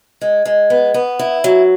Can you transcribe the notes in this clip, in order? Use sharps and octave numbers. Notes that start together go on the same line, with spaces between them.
G#3
G#3
B3
B3
E4
F#3